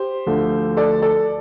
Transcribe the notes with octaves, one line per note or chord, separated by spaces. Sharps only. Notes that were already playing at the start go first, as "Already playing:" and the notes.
Already playing: G4 C5
D2 D3 F3 A3
A4 D5
A4 D5